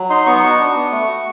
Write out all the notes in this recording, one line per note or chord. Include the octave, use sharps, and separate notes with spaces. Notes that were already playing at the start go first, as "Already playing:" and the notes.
Already playing: F#3
D#4 C6
B3 C#6
F#4 C#6
D4
B3
A3
F#4